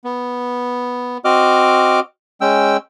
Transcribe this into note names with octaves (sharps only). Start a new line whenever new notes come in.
B3
C4 F#4 D#5 D6 F6
G#3 C#4 G5 E6